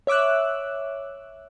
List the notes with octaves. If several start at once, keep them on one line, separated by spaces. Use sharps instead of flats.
C#5 E5 D6 E6 F#6